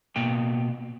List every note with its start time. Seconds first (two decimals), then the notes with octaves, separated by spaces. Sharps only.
0.16 B2 A#3 G5